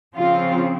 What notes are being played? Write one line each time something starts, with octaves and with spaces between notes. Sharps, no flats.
C#3 F3 C4 F4